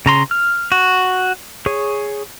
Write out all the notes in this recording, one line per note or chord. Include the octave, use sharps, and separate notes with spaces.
C#3 A#5 C6
F6
F#4
G#4 C#5